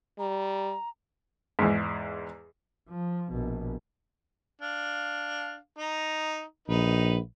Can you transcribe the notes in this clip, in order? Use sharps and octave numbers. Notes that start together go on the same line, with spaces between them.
G3 A#5
E2 G#2
F3
A#1 B2
D4 F5
D#4 A#5
A#1 D#4 B4